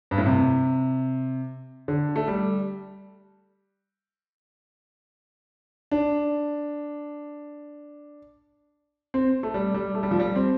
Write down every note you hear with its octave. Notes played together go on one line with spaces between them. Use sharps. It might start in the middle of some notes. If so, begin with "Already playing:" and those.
G2
A2
C3
D3
A3
G3
D4
C4
A3
G3
G3
A3
G3
F3
G3
C4